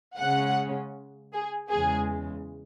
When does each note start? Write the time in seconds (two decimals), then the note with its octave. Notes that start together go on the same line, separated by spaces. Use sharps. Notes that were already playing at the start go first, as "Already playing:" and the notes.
0.17 C#3 G#3 C#4 F#5
1.33 G#4
1.71 E2 C#3 G#3 G#4